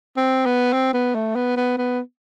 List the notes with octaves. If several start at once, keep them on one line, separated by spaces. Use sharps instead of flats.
C4
B3
C4
B3
A3
B3
B3
B3